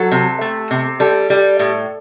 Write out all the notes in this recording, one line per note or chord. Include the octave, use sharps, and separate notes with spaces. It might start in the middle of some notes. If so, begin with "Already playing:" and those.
Already playing: F#3 A4
C3
A3
C3
G3 A4
G3
A2